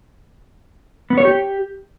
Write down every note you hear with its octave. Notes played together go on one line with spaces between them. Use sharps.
B3
C#5
G4